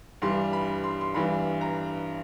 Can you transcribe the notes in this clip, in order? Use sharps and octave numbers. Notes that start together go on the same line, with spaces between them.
G2 E3 G3 C6
B5
C6
C6
G2 E3 G3 B5
A#5